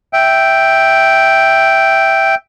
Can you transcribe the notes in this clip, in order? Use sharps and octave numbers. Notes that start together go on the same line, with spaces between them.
E5 G5